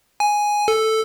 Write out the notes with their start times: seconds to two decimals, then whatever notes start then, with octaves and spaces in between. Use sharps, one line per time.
0.20 G#5
0.68 A4